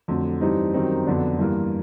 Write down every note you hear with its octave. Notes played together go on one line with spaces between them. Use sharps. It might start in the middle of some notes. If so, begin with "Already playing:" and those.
F2 D3 F#3 A3
G2 E3 G3 C4 D#4
F#2 D#3 G3 C4 D#4
F2 D3 F#3 B3 D4
G2 E3 G3 A#3